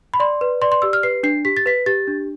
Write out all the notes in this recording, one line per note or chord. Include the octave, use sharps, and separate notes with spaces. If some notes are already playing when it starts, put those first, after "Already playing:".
B5
D5 C6
B4
D5 C6
C6
G4 E6
F6
B4 C7
D4 C7
G4 B6
A6
B4 B6
G4 A6
D4